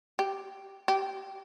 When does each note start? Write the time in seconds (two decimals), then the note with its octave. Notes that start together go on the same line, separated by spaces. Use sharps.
0.19 G4
0.88 G4